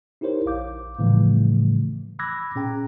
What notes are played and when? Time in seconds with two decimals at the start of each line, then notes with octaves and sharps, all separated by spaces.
0.21 D#4 E4 G4 A#4 C5 C#5
0.46 A#1 F5 D6 G6
0.99 A2 C#3 E3 F3 G3 A3
2.19 B5 D6 E6 F#6 G#6 A#6
2.55 A#2 C#4 G#4 G5 A#5